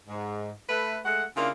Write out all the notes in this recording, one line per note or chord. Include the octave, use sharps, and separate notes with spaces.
G#2
A3 B4
G#3 A3 F#5
C#3 A#3 D4 E4 F4